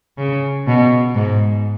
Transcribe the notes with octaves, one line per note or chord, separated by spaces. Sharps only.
C#3
B2
G#2